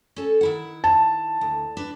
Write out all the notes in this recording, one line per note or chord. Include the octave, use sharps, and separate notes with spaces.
C#4 A4
D#3 E4 F#5
A5
D2
D4 B4